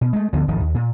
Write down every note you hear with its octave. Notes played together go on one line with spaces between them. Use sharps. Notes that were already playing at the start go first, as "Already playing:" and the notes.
B2
G#3 A3
D2 D3 F3 B3
D1 G#1 D#3 F3
D#2
A#2